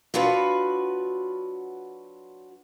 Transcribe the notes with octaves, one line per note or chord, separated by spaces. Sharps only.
F#3 D4 F4 F#4 B4